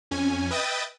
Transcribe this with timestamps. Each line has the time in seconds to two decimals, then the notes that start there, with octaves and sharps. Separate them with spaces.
0.11 F2 C#4 G#5
0.51 B4 D#5 E5 G5 D#6 A6